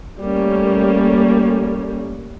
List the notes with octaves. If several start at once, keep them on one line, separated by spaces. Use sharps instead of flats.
G3 A3 A#3 C#4